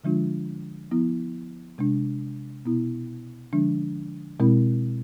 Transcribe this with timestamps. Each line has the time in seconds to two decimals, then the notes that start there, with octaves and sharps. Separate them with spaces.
0.04 D3 F3 G#3 D4 F4
0.91 F3 B3 E4
1.78 C3 G#3 D4
2.65 B2 B3 E4
3.52 D3 F3 G#3 D4
4.40 B2 G#3 C4 E4